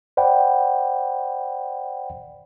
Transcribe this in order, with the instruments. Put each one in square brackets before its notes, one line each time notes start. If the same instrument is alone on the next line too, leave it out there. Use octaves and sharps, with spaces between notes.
[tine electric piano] C5 D5 F#5 G5 B5